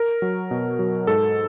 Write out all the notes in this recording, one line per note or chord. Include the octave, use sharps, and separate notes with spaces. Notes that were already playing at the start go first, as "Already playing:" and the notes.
Already playing: A#4
F#3
B2
F#3
G#2 A4